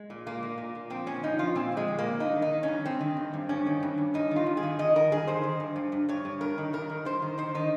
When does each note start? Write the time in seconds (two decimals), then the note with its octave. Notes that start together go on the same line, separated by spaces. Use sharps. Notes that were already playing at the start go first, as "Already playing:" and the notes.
Already playing: G#3
0.10 A#2
0.26 A#2 A#3
0.43 A#2
0.58 A#2
0.75 A#2
0.90 F3 C4
1.06 A#2 C#4
1.23 F3 D#4
1.39 F3 F4
1.55 A#2 C4
1.72 F3 G#3
1.88 A#2
1.99 A#3
2.04 A#2
2.20 G2 D#4
2.36 D#3
2.42 D#4
2.53 D#3
2.63 C#4
2.68 G2
2.85 G2 C4
3.01 D#3
3.17 G2
3.33 G2
3.49 G2 C#4
3.66 D#3
3.83 G2
3.98 G2
4.14 G2 D#4
4.31 D#3 F4
4.46 G2
4.57 G#4
4.63 D#3
4.79 D#3 D#5
4.96 D#3 A#4
5.12 G2 G#4
5.27 D#3 C5
5.43 D#3
5.60 G2
5.76 G2
5.92 G2
6.09 G2 C#5
6.25 G2
6.41 G2 A#4
6.58 D#3
6.73 G2 A#4
6.90 D#3
7.05 G2 C5
7.22 D#3
7.38 D#3 C5
7.55 D#3 D#4